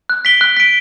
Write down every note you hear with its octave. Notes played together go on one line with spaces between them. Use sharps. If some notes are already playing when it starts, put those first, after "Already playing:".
F#6
B6 D7 G7
F#6
B6 D7 G7